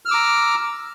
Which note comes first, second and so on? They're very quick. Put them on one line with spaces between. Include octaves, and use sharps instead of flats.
F6 E6 D6 A#5